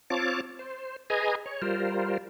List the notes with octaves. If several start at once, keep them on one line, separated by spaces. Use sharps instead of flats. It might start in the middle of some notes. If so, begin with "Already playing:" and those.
C4 F4 C#5 A5 D6
C5
G#4 B4 D#5 G#5 A#5
C#5
G3 F4 A#4 C5